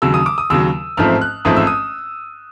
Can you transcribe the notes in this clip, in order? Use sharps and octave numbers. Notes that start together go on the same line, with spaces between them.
D#2 C#3 F#3 E6
D#6
D6
D#6
D#2 C#3 F#3 E6
A1 G#2 F3 A3 C4 F6
F#6
A1 G#2 F3 A3 C4 D#6
E6
D#6